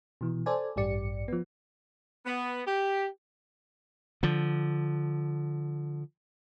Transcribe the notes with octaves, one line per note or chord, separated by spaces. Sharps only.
B2 E3
A4 C5 D5 G#5
A1 G2 G4 D5 C#7
F3 B3
B3
G4
D3 F3